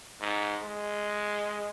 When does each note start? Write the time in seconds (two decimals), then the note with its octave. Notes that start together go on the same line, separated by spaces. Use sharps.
0.21 G#2
0.63 G#3